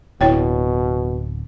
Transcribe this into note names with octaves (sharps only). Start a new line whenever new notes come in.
D1 B2 E4 C#5 G5